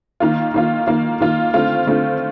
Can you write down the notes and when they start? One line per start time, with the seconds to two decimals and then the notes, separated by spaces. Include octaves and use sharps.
0.20 D#3 A#3 F4
0.54 D#3 A#3 F4
0.87 D#3 A#3 F4
1.21 D#3 A#3 F4
1.53 D3 A3 C4 F4
1.87 D3 A3 C4 F4